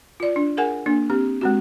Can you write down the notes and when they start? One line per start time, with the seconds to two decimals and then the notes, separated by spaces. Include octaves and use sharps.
0.20 F4 D5
0.36 D4
0.57 G#4 A#4 F#5 G#5
0.86 A#3 D4
1.10 C4 G4
1.41 G#3 C4 F#4